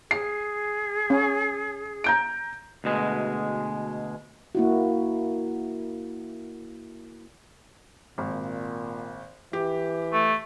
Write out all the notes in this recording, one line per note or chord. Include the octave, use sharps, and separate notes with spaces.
G#4 C7
C#4
A#5 G6 D7
D2 B2 G#3
A#3 E4 F#4
G#1 A#2
E3 G4
A3